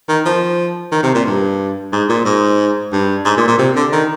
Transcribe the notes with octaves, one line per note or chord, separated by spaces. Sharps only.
D#3
F3
D#3
C3
A#2
G2
G#2
A#2
G#2
G2
G#2
A#2
A#2
C3
D3
D#3